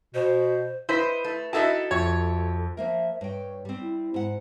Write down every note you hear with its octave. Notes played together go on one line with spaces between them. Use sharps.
B2 C5
E4 B4 C5 D#5 B6
A3
D#4 E4 F#4 A4 E5 A5
F2 C#5
F3 A#3 A#4 E5
G2 C#5 G5
G3 C4
E4
G#2 F#5